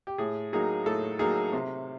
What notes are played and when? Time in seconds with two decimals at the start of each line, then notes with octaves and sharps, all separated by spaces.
0.07 G4
0.18 A2 G#4
0.53 F#3 A#3 D#4 G#4
0.86 A2 A4
1.19 F#3 A#3 D#4 G#4
1.53 C3